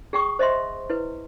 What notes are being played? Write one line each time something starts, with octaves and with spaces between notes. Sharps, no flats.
G#4 G5 C#6 D#6
C5 D#5 E5 C6
E4 B4